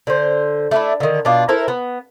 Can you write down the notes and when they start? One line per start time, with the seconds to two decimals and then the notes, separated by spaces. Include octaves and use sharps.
0.07 D3 C5
0.71 A3 D4 E4
1.00 D3 D#3
1.25 B2 D4 F4
1.49 E4 A4 A#4 C5
1.68 B3